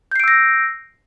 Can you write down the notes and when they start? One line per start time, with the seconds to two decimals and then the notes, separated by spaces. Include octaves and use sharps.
0.11 G6
0.16 C7
0.20 D7
0.24 E6
0.28 A#6